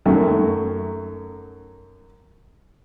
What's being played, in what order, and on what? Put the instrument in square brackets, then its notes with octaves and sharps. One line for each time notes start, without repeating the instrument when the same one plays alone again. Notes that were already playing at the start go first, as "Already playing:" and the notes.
[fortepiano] F#2 D#3 F#3 A3 E5